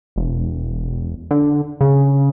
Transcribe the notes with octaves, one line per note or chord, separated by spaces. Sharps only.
E1
D3
C#3